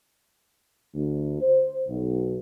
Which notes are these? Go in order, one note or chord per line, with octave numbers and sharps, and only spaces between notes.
D2
C5
B1